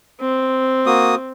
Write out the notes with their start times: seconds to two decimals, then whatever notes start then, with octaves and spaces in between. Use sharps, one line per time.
0.21 C4
0.86 A#3 F#4 D#6